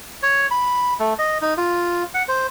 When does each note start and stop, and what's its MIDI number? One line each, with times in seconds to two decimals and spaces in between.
0.23 0.47 73
0.51 0.94 83
0.99 1.14 57
1.19 1.38 75
1.42 1.54 63
1.57 2.03 65
2.14 2.23 78
2.28 2.47 72